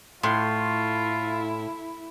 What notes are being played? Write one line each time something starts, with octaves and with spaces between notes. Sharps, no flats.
A2 E4 F4 C6